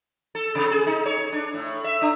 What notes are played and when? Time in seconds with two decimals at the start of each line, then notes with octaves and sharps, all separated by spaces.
0.35 A4
0.55 C3
0.71 G#4
0.87 D#4
1.06 C#5
1.32 D4
1.54 A2
1.84 E5
2.02 D4